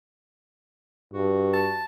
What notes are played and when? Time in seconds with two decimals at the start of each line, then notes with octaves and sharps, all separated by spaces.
1.13 G2 F#4
1.53 A5